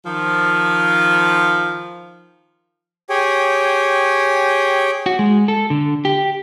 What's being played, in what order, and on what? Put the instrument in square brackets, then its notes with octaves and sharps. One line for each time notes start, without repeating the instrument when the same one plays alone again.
[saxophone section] D#3 F3
[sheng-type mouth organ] G4 G#4 C#5 G5 G#5
[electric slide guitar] F#4
G#3
A4
D3
G4